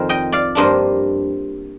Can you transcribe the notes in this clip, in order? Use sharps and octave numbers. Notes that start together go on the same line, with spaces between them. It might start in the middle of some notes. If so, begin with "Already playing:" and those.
Already playing: F2 D#3 C5
D#5 G5
D5 F5
G2 F3 A#3 D4 F4 C5 D#5